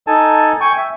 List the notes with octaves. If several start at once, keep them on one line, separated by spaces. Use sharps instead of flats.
D#4 A4 G#5 A5
G5 G#5 C#6
E5